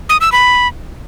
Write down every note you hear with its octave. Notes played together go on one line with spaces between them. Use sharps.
D#6
E6
B5